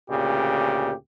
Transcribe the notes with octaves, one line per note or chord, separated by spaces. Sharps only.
D2 A#2 C#3 G4